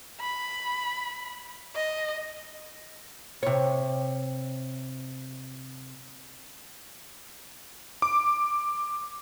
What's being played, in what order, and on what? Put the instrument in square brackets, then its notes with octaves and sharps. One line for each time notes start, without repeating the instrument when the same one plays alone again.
[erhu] B5
D#5
[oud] C3 C#5
[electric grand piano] D6